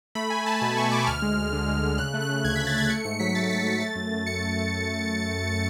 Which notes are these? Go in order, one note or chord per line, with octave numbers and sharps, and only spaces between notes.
A3 B5
A3 G#5
A3 A5
B2 A5
A3 C#6
A3 D6
D2 F6
G#3
D2
D3
G#3
D3
C#3 F#6
A3
F#6
C#3
D2 G#6
B6
D2
A6
A3 G#6
A3 C#7
G#2 C#7
F#3 B6
A3 A6
A3 B6
A3 B6
A3 A6
F#2
F#2
F#2 C#7
A3
A3